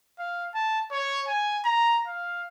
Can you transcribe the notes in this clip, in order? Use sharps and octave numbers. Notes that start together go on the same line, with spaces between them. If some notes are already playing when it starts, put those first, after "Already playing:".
F5
A5
C#5
G#5
A#5
F5